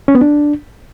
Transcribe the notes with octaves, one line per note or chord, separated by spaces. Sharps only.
C#4
B3
D4